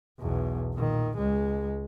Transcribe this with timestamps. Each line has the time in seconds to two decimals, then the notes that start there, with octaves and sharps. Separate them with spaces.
0.20 B1 E2
0.75 A#2 D#3
1.17 C#2 G#3